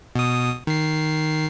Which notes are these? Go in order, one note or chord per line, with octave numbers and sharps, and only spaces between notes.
B2 D#6
D#3 C7